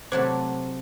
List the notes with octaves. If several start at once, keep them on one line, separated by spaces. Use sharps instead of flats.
C3 F#3 A3 C5 D6